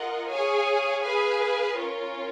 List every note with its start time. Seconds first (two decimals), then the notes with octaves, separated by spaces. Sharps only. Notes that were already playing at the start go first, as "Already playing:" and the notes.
Already playing: F4 A#4 D#5 F#5
0.29 G#4 C#5 F5 G#5
1.03 G#4 B4 F5 G#5
1.77 C#4 F4 A#4 C#5